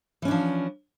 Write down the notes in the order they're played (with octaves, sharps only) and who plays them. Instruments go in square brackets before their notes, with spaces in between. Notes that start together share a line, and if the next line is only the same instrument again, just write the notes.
[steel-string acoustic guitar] E3
C#4
D4
F3